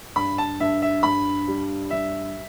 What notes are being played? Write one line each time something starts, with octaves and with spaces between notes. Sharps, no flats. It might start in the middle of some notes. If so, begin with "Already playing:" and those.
G2 B5
A5
G2 E5
E5
G2 B5
G3
G2 E5